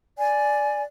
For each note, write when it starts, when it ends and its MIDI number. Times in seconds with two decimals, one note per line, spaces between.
0.18 0.83 74
0.18 0.83 80